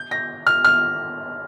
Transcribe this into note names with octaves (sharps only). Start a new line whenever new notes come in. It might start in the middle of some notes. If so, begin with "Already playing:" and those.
Already playing: G6
A#6
F6
F6